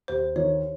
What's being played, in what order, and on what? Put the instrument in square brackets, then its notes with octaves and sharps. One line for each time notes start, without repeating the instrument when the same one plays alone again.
[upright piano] D#2 [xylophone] C5
[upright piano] D#3 [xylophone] C#5